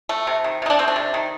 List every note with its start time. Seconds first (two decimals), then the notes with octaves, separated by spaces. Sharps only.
0.09 A3
0.27 C3
0.44 D#3
0.62 C3 D#4
0.70 D4
0.79 A3 C4
0.88 D4
0.96 C3
1.14 D#3